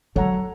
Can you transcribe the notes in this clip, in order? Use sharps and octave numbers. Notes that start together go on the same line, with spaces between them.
F#3 A4 C#5 F#5 A#5